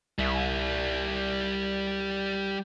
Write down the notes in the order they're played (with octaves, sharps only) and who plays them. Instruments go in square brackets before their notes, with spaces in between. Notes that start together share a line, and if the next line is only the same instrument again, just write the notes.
[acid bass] C2 [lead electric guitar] G3 E5